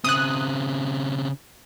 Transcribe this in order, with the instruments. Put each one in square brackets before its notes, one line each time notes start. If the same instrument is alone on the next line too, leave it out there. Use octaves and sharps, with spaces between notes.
[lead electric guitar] C#3 C4 [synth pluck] D#6 F#6